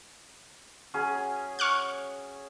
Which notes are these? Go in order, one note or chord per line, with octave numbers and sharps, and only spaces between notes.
F#3 C#4 G#4
C#6 F6 F#6